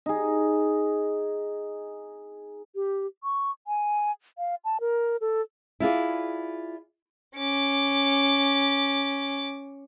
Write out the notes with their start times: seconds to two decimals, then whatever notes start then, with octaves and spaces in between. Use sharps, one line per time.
0.06 D#4 G#4
2.75 G4
3.24 C#6
3.67 G#5
4.38 F5
4.65 A5
4.81 A#4
5.21 A4
5.80 E4 F4 G#4 D5
7.37 C#4 D6